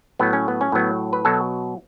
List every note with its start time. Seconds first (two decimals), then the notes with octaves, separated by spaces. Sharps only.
0.19 A2 F#3 B3
0.33 C#4
0.48 B3
0.61 C#4
0.72 A2 F#3 B3
1.13 B4
1.25 B2 F#3 A4